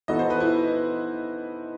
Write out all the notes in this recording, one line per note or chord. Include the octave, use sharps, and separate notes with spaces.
E3 B3 D#4 F#4 A4 D#5
C5
B4
E4